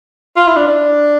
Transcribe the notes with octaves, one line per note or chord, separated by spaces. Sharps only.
F4
E4
D4
D4